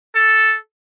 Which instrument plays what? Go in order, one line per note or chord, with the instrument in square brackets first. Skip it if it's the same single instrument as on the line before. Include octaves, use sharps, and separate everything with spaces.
[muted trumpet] A4